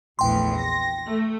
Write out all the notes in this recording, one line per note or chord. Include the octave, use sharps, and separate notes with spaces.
A#1 E2 A2 G5 C6
A#6
A3